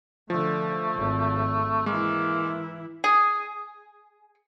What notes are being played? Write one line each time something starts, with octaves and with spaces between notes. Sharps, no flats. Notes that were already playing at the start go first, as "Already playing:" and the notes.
D3 F3 A3
G#1
E3 G#3 A#3 E4
G#4